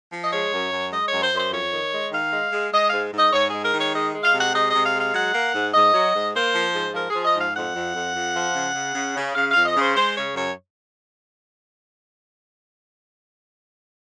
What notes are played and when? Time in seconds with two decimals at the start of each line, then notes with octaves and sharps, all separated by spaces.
0.12 F3
0.24 D#5
0.32 G#3 C#5
0.53 F#2
0.73 F#2
0.92 G#3 D#5
1.07 C#5
1.12 F#2
1.22 C5
1.33 F#2 C5
1.52 F2 C#5
1.73 D#3
1.93 G#3
2.12 D#3 F5
2.33 G#3
2.52 G#3
2.73 G#3 D#5
2.88 G#2 F5
3.13 G#2
3.19 D#5
3.33 G#2 C#5
3.48 G#4
3.54 G#3
3.63 A#4
3.73 D#3 C#5
3.93 G#3 D#5
4.13 G#3
4.23 F5
4.33 C3
4.39 F#5
4.54 G#3 D#5
4.69 D#5
4.74 C3
4.84 F5
4.94 G#3 F5
5.14 F#3 F#5
5.34 A#3
5.54 G#2
5.73 G#2 D#5
5.93 F#3
6.14 G#2
6.34 A#3 C5
6.54 F3
6.74 G#2
6.94 F3 A#4
7.10 F3 G#4
7.25 D#5
7.35 G#2 F5
7.54 F2 F#5
7.74 F2
7.94 F2
8.15 F2
8.35 F3
8.55 C#3
8.74 C#3
8.94 C#3
9.15 C#3
9.35 C#3 F5
9.50 F5
9.55 F2
9.65 D#5
9.76 C#3 C5
9.95 G#3 C5
10.15 C#3 C#5
10.36 F#2 C#5